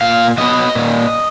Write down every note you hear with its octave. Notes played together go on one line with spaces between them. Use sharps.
A#2 F5
F#3 B3 D#5
A#2